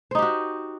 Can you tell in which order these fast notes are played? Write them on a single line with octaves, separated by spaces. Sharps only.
C5 D#4 G4 F#4